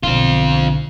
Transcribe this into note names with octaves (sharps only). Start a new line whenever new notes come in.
B1 D3 C4 F4